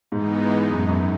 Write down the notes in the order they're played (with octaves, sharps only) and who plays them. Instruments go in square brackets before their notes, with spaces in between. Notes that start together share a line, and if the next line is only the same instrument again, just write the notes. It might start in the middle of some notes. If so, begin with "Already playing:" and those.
[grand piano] G#2 [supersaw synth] E3 G#3 B3 D#4
[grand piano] F#2
G#2
F#2